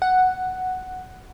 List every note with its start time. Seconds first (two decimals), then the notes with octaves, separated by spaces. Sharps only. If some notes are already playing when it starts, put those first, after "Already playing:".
0.02 F#5